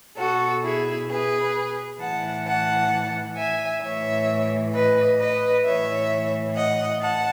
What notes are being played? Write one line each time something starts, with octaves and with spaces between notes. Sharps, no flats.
B2 F#4 A4
E4 G#4
G#4 B4
A2 E3 F#5 A5
F#5 A5
E5 G#5
A2 E3 C#5 E5
B4 D#5
B4 D#5
A2 E3 C#5 E5
D#5 F#5
F#5 A5